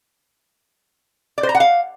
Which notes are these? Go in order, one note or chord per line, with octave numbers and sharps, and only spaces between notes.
D5
C5
A#5
F#5
F5